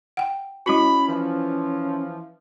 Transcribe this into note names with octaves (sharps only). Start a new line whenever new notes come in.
F#5 G5
G#3 C#4 E4 F#4 B5
E3 F3